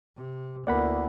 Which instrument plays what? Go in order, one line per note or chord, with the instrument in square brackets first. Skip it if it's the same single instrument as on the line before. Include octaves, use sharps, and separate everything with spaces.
[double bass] C3
[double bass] D2 E4 [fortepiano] A#3 B3 [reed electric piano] D5 F#5 B5